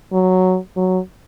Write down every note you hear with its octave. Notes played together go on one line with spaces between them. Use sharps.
F#3
F#3